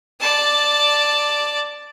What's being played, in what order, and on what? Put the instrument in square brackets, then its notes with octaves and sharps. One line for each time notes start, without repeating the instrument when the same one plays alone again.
[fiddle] D5 A5